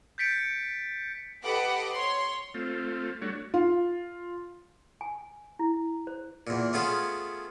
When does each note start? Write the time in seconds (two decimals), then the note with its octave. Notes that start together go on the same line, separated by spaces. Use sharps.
0.18 G6 A6 B6 C#7 D7
1.43 G4 A4 B4 D#5 F#5 D6
1.92 C#5 C6
2.54 A3 C4 F4
3.22 G3 A3 D4 F#4 C#5
3.54 F4
5.01 G#5
5.59 E4
6.07 C5
6.47 E2 A#2
6.73 A3 B3 C#4 F4 G#4